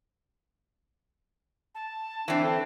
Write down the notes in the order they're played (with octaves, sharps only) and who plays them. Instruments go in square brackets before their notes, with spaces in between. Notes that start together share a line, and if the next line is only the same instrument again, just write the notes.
[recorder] A5
[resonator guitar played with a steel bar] E3 C4 [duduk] D4
[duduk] A4